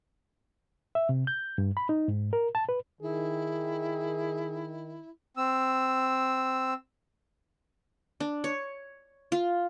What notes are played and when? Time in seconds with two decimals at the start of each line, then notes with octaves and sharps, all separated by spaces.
0.95 E5
1.09 C3
1.27 G6
1.58 G2
1.77 B5
1.89 D#4
2.08 G#2
2.33 A#4
2.55 A5
2.69 B4
3.02 D#3 E4 G#4
5.37 C4 E6
8.20 D4
8.44 C#5
9.32 F4